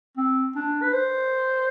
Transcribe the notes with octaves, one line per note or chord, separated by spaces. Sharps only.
C4
D4
B4
C5